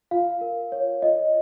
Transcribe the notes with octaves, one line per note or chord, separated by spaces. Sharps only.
F4 F5
A#4
C#5
F4 D#5